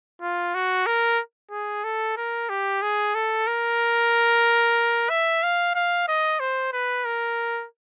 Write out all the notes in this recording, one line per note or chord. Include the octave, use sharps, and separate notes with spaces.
F4
F#4
A#4
G#4
A4
A#4
G4
G#4
A4
A#4
E5
F5
F5
D#5
C5
B4
A#4